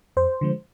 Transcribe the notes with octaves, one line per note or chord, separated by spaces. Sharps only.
F2 C5
D3 F3 G#3